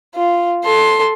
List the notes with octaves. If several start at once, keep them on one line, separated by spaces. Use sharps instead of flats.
F4
A4 C6